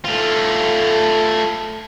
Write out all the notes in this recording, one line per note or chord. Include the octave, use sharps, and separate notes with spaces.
A3 F4